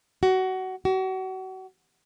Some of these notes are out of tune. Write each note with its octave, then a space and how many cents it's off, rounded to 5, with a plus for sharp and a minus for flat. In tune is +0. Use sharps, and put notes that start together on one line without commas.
F#4 +20
F#4 +35